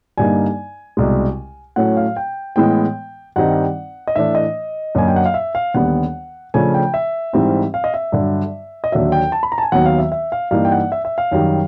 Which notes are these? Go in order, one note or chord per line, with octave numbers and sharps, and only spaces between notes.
G2 D3 G3 A#3 D#4 G#5
C2 B2 G#3
A2 F#3 A3 C#4 F#5
F5
G5
A2 E3 G#3 B3 G5
G2 D#3 G3 C4 D#4 F#5
D#5
A2 E3 A3 D4 E5
D#5
F#2 D3 F#3 A#3 G#5
G5
F#5
F5
E5
F5
D#2 D3 G3 B3 F#5
C#3 F3 A3 D4 G#5
G5
E5
G#2 E3 G3 C4 D#4
F5
D#5
E5
G2 D3 F#3
D#5
D#2 D3 F#3 E5
G5
A5
B5
A#5
A5
G#5
D#2 D#3 F#3 B3 F#5
F5
E5
E5
F5
G2 E3 G3 A#3 D#4 F5
G5
F#5
E5
E5
F5
F#2 D#3 G3